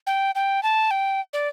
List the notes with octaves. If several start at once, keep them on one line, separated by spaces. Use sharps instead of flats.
G5
G5
A5
G5
D5